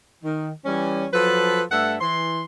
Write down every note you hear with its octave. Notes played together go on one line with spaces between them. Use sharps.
D#3
E3 G3 C#4
F3 F#3 A4 B4
G2 A3 A4 E5 F#5
E3 C6